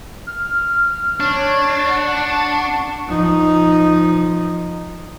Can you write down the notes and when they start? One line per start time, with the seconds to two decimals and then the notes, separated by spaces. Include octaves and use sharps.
0.27 F6
1.20 D4 C#5 C#6
1.89 F#5
3.08 F3 D#4